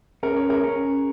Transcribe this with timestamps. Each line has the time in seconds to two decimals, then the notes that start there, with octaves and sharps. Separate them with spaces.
0.23 C#4 A#4
0.36 C#5
0.50 A#4
0.64 C#4 G#4